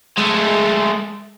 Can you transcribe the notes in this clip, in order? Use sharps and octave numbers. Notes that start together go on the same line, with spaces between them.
G#3 A3